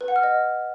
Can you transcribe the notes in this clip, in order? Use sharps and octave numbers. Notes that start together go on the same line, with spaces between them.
B4
F#5
F6
D#5